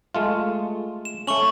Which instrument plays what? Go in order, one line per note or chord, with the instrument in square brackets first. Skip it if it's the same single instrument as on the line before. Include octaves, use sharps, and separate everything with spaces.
[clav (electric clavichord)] G#3 A3 F4
[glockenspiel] E7
[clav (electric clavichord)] A3 C#4 [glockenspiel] C#6 F#7